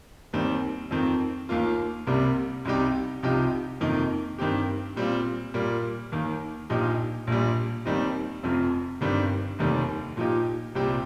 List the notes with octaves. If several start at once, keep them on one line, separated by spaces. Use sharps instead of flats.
D#2 D#3 G3 C4
F2 D#3 C4
D#2 D#3 A#3 F4
C2 C3 G3 A#3 G4
C2 C3 G3 D#4 G4
C2 C3 F3 D#4 G4
F2 C3 D#3 A#3 D#4
G2 D#3 C4 G4
A#2 G3 C4 F4
A#2 G3 A#3 F4
D#2 D#3 A#3
A#1 A#2 F3 D#4 G4
A#1 A#2 G3
D#2 D#3 G3 C4 D#4
F1 F2 C3 F3
G1 G2 D#3 G3 C4
F1 D#2 D#3 G3
A#2 F3 D#4 G4
C2 A#2 G3 C4 G4